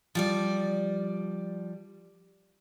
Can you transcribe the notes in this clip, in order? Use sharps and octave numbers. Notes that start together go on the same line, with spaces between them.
F3 G3 D5